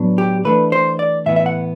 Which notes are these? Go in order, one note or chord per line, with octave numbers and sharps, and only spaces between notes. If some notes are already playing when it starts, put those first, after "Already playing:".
Already playing: A2 F#3 B3 D4
G4
E3 A3 D4 B4
C5
D5
A2 E3 B3 E4 E5
E5
F#5